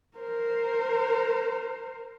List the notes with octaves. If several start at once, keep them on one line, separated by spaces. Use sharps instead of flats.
A#4 C5